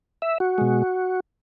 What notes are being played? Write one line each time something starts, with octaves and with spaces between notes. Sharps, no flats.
E5
F#4
B2 G#3